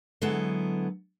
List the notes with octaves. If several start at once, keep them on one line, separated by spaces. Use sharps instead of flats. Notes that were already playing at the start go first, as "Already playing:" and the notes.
D3 F#3 G#3 B3 E4 A4